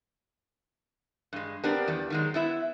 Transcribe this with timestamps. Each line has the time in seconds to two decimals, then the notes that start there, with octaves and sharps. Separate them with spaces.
1.33 G2 G#3
1.64 B3 C4 D4 G4 A#4
1.88 E2 G3
2.10 D#3 F#3 G#3
2.34 B3 E4 E5